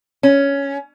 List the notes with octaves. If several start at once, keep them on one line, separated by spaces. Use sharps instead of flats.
C#4